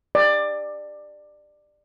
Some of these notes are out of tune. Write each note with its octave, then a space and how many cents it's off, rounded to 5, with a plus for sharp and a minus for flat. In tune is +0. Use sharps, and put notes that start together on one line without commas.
D5 +20